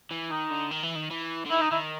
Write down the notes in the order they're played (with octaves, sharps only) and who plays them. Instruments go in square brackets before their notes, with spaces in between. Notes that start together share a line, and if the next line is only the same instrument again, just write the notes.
[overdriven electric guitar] E3
[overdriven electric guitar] D#3 [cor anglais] D#4
[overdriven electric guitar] D3
D#3
E3
D#3
E3
D3
[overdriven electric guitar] D#3 [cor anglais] E4
[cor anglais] D#4
[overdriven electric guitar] D#3 [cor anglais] E4